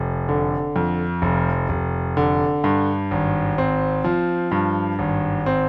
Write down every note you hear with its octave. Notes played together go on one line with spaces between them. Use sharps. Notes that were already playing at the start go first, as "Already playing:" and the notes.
Already playing: F1
D3
F2
F1
F1
D3
G2
G#1
C4
F3
G2
G#1
C4